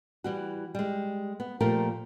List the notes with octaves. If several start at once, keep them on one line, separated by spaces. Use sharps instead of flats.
E3 G3 F#4
G3 G#3
B3
A#2 F3 A3 A#3 G4 A#4